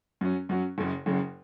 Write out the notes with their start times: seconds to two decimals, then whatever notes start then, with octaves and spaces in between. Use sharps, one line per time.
0.21 F#2 F#3 C#4
0.49 F#2 F#3 C#4
0.78 F#1 F#2 C#3
1.06 F#1 F#2 C#3